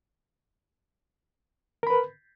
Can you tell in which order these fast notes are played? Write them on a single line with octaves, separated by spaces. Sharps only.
A#4 B5 B4